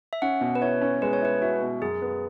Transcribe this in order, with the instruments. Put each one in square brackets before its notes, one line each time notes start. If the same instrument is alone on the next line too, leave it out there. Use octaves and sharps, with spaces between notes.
[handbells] E5
[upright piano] C#4 [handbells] F#5
[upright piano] B2
[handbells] B4
[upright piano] E4 [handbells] C#5
[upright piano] C#4
[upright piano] G#3 [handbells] B4
[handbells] C#5
[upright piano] E4 [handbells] B4
[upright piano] E4 [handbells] F#4
[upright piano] B2
[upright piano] F#2 [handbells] G#4
[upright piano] B3